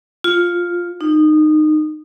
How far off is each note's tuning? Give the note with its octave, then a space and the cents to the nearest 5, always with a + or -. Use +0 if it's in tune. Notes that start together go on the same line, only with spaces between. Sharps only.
F4 +5
D#4 -20